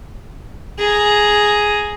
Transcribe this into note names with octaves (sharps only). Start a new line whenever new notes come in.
G#4 A#5